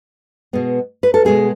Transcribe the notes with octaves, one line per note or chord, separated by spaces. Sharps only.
B2 G#3 B3
B4
A4
B2 G#3 B3 G#4